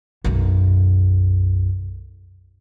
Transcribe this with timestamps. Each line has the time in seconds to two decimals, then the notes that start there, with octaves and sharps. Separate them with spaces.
0.24 B1 F#2